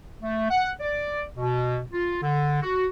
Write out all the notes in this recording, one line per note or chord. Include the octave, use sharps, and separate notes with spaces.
A3
F#5
D5
B2
F4
D3
F#4